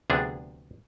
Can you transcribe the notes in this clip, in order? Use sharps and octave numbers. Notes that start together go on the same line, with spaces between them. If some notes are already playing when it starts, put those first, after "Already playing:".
D2 C3 F3 B3 D4 G#4